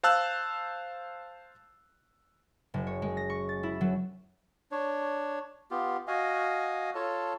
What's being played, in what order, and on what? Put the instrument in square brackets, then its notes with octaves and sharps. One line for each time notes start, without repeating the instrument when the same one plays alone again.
[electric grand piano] C5 F5 A5 E6 F#6
[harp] F#1
C#5
G#3
A#6
C#6
A6
E4
F#3
[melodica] D4 C#5
B3 F4 G4
F#4 D#5 F5 G#5
F4 A4 C#5 A5